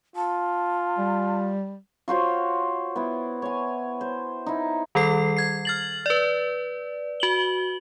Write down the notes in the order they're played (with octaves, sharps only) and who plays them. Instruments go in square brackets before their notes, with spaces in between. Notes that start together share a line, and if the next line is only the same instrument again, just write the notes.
[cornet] F4 [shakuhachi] A5
[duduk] G3
[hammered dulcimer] F4 F#4 C5 C#5
B3 E4
C#5 G#5
C5
D#4 E4
[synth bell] D#3 G3 A4 C7
G#6 C7
F6 A6 F#7
B4 D5
F#4 F#7 G7